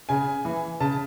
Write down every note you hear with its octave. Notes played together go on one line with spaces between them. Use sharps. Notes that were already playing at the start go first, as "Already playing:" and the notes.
C#3 G#5
E3
C#3 A5